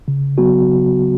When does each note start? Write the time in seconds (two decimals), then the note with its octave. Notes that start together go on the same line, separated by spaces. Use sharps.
0.08 C#3
0.38 F#3 B3 F#4
0.67 C#3